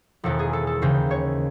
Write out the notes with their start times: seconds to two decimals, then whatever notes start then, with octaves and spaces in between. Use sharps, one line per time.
0.24 E1 E2 D#3 A4
0.39 G#4
0.53 A4
0.67 A4
0.82 D#2 C#3 E3 C5
1.11 C#5